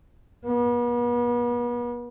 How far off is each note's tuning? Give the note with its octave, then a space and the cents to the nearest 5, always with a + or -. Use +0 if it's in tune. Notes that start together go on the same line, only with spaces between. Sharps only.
B3 -40